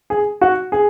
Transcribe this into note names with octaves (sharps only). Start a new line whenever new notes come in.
G#4
F#4
G#4